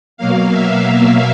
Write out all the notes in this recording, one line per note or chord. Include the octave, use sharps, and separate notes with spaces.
B2 F#3 A#3 F5
E5